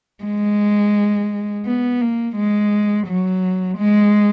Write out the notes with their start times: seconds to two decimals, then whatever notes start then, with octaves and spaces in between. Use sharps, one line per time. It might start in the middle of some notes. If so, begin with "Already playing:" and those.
0.24 G#3
1.66 B3
2.01 A#3
2.36 G#3
3.07 F#3
3.78 G#3